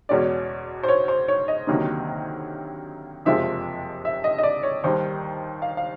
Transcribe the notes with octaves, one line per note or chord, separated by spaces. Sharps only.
E2 B2 G#3 C#4 D5
C5
C#5
C5
C#5
D#5
D2 C3 D#3 F#3 A#3
F#1 F2 C3 F3 G#3 E5
E5
D#5
D#5
D5
C#5
D#2 D#3 G3 C5
F5
F5